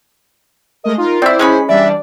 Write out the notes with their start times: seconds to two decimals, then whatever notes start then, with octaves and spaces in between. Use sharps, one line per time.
0.84 G#3 A3 A#4 D#5
0.98 D#4 F4 A#4
1.22 C4 E4 C5 D5 E5
1.39 G#3 C#4 G#4 B5
1.69 E3 G3 D4 D5 E5